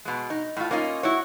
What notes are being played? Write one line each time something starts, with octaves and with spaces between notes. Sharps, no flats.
B2 G#3
D#4
A2 F4
A#3 C#4 D#4 F4
E4 F#4 C#5